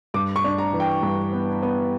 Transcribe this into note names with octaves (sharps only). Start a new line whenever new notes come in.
G2 D6
C#6
D4
A#5
E3
G5
G2
B3
B3